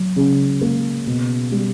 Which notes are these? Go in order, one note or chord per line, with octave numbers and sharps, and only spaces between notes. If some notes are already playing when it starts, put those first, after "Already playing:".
Already playing: F#3
C#3
A#3
B2
G3